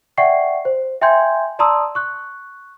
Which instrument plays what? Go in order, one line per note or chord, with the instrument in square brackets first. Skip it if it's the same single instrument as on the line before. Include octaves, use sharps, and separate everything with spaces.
[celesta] D5 E5 F#5 G5 C#6 C7
C5
E5 G5 G#5 C6 G6 G#6
D5 A5 A#5 C6 D#6 E6
C#6 F#6